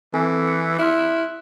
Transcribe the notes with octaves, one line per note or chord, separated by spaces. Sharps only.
E3 C4 A4 G#5
E6 F#6 C#7
E4 C6 F6 F#6